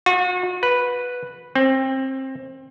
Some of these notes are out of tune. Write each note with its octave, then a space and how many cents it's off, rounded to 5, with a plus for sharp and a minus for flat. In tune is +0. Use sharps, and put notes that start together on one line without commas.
F#4 -40
B4 -5
C4 +25